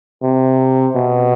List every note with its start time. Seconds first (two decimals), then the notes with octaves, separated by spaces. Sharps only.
0.22 C3
0.96 B2